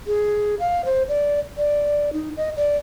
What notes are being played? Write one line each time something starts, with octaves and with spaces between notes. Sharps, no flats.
G#4
F5
C5
D5
D5
D#4
D#5
D5